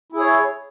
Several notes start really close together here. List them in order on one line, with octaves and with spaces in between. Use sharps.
E4 G#4 C#5